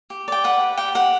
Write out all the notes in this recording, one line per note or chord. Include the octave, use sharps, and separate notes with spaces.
G4
D5 G5
B4 F#5
G4
G4 G5
G4 F#5